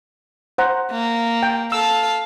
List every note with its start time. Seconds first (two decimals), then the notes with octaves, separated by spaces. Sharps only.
0.58 C5 F#5 A#5
0.91 A#3
1.43 G5
1.72 A4 F5 E6